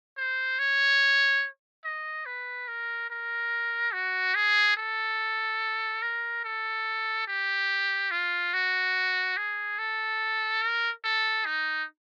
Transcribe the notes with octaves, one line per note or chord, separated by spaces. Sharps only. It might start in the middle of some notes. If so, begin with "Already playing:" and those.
C5
C#5
D#5
B4
A#4
A#4
F#4
G#4
A4
A#4
A4
G4
F4
F#4
G#4
A4
A#4
A4
D#4